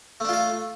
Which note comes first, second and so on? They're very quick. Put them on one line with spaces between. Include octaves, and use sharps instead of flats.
A3 D4 F4 A4